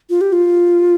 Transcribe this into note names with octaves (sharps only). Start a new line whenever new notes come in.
F4
G4
F4